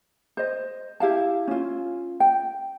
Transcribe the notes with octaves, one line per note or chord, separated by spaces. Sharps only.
C5 D#5
E4 G4 F5 A5
C#4 F4
G5